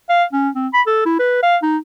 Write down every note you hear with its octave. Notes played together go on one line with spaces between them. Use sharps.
F5
C#4
C4
B5
A4
E4
B4
F5
D#4